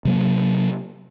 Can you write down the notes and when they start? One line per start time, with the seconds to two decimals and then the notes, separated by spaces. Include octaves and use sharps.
0.05 C3 F#3 A#3